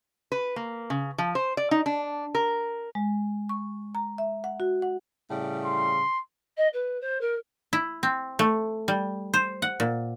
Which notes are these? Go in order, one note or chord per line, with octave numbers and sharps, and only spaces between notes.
B4
A#3
C#3
F3
C5
D5
D#4
D4
A#4
G#3
C#6
A#5
E5
F#5
F#4
F#5
A2 C#3 G3
C6
D#5
B4
C5
A#4
E4
C4
A3
G3
C5
F#5
A#2